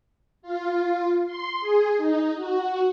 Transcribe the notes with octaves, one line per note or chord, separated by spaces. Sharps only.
F4
C6
G#4
D#4
F#4